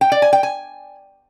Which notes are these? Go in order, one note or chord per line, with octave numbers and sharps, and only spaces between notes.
G5
D5
G#5
G5
G#5